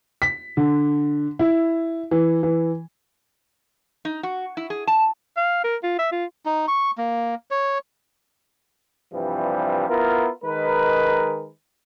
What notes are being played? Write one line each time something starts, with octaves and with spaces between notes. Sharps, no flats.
B6
D3
E4
E3
E3
D#4
F#4
E4
G#4
A5
F5
A#4
F4
E5
F4
D#4
C#6
A#3
C#5
G2 C3 E3 F3 G3
B3 E4 F4 A#4
D#3 G#3 A#4 B4